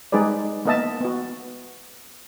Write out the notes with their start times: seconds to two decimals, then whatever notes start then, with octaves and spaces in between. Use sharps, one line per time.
0.12 G3 G#3 D#4 G#4 B4 D5
0.65 A#3 B3 A#4 D#5 E5 A5
1.01 B3 F#4